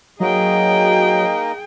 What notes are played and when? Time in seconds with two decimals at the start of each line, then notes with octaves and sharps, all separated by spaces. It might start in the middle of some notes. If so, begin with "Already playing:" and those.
0.20 F#3 A#3 D#4 G#4 D#5 G5